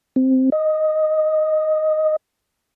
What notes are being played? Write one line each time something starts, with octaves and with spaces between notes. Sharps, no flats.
C4
D#5